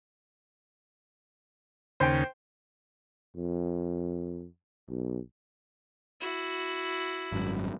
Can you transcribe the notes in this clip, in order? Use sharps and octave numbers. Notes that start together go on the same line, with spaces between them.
D#2 C#3 C5 G5
F2
B1
E4 F#4
G#1 F#2